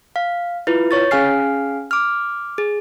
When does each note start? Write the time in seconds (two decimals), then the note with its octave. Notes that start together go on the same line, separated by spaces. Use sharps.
0.16 F5
0.67 E4 F4 B4
0.91 C#5 C#6 A6
1.11 C#4 G#4 F5 G#5 F6 C7
1.91 D6 F6
2.58 G#4